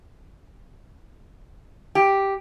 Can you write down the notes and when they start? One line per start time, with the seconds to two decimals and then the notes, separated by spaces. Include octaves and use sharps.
1.95 G4